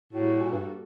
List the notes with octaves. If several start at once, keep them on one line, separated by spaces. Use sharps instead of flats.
A2 G3 A#3 F#4 A4
A#2
G2